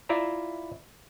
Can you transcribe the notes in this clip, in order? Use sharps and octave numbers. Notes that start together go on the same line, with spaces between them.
E4 F4 D5 E5 A#5